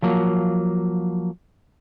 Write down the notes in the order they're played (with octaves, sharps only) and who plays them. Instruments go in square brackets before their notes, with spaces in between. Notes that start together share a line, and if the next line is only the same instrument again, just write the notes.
[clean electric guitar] F3 F#3 A#3